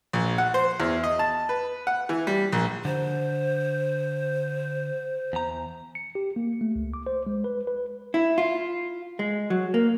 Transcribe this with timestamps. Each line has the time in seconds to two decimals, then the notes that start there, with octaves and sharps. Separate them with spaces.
0.13 A#1
0.38 F#5
0.54 C5
0.80 E2
1.04 D#5
1.19 A5
1.49 B4
1.87 F#5
2.09 E3
2.27 G3
2.52 A#1
2.85 D3 C5
5.33 E2 A#5
5.95 C#7
6.15 G4
6.36 A#3
6.61 A3
6.76 C#2
6.94 D6
7.07 C5
7.27 G#3
7.44 B4
7.67 B4
8.14 E4
8.38 F4
9.19 G#3
9.50 F#3
9.74 A#3